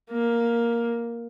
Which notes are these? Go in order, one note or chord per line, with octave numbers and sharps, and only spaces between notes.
A#3